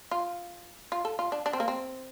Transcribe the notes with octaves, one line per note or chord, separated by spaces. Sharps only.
F4
F4
A4
F4
D4
D4
C4
A#3
C4